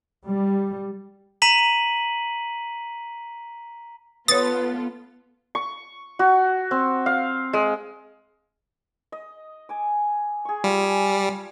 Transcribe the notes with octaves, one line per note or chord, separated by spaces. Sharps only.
G3
A#5 B6 D#7 F#7
B3 F4 A4 B4 C#5 D#6 A6
C#6
F#4
C4
F5
G#3
D#5
G#5 D6
G#4 C#6
G3 F4 C6
G#5 A5